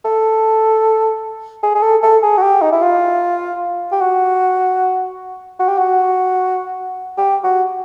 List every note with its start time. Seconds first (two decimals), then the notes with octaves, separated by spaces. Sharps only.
0.05 A4
1.63 G#4
1.75 G#4
1.83 A4
2.03 A4
2.23 G#4
2.38 F#4
2.43 G4
2.62 D#4
2.72 E4
2.82 F4
3.92 G4
4.01 F#4
5.60 F#4
5.69 G4
5.78 F#4
7.18 G4
7.44 F#4